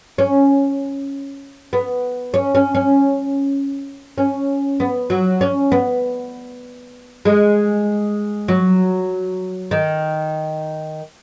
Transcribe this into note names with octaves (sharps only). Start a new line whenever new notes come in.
C#4
B3
C#4
C#4
C#4
C#4
B3
F#3
C#4
B3
G#3
F#3
D#3